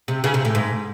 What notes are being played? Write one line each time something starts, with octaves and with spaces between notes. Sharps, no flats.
C3
C#3
C3
A2
G#2